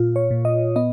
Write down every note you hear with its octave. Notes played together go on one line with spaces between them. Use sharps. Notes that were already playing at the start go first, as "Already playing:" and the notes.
Already playing: A#2 F4
C#5
A#2
D#5
B3 D#5